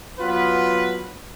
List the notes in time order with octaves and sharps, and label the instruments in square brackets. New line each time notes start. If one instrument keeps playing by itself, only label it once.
[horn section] F#3 B3 F4 B4